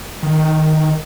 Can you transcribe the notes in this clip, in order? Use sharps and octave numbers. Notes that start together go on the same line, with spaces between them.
D#3